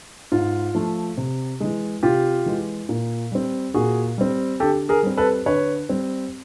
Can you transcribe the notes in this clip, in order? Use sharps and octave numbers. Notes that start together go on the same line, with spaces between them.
G#2 F4
F3 A3
C3
E3 G#3
C3 F4 G4
E3 G#3
A#2
G3 C4
A#2 F#4 G#4
G3 C4
D3 G4 A4
G#4 A#4
G3 C4
A4 B4
D3 B4 C#5
G3 C4